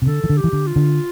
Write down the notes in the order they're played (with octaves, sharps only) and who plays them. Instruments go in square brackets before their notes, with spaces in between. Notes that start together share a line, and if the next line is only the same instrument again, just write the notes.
[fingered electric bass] C3
[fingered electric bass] D3 [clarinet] A4
[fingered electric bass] E3
D3
[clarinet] G4
[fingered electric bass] E3
D3
[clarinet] F4
[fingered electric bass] D3